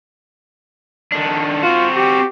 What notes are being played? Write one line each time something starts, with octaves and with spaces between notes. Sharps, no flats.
D#3 D4
C4 F4 F#4
G4